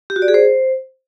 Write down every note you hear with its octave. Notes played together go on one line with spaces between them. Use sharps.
G4
F#4
D5
G#4
C5